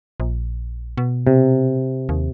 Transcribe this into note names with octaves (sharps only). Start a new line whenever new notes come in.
A#1
B2
C3
D#2